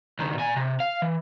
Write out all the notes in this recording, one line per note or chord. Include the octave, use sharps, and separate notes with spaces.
C#2 D#3
A#2 G#5
C3
F5
E3